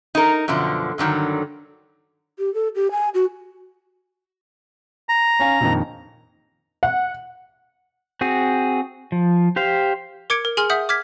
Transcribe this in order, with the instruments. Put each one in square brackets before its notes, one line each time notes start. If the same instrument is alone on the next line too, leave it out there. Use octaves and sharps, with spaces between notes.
[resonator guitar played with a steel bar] D#4 A#4
F#2 B2 D3 F3
G2 D3 D#3 F#3
[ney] G4
A4
G4
G#5
F#4
[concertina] A#5
[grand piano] C#4 F5 G#5
A#1 F2 D#3
[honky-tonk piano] F#5
[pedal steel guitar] C4 F#4 G#4
F3
G4 C5 F5
[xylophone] A#4 D6 G#6 C#7 D7
A#4
G#4 G#5 C6 F6
E5 F#5 D#6 G6 F#7
D6 F6 G#6 B6